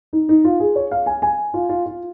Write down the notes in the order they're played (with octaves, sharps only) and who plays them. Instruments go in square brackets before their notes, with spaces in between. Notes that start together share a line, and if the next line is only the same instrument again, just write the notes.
[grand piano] D#4
D#4
F4
G#4
C#5
F5
G#5
G#5
F4
F4
F4